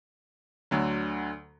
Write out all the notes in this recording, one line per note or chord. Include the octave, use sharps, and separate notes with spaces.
D2 D3 F#3